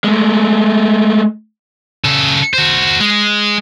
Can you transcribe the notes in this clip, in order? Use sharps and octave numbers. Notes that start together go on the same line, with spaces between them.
G#3 A3
C#3 A4
F#4 C5
G#3